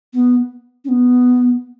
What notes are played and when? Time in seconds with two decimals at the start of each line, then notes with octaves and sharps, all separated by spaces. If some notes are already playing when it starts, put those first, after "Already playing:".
0.13 B3
0.85 C#4
0.89 B3